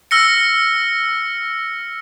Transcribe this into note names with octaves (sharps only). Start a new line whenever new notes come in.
E6 F6 A#6 C#7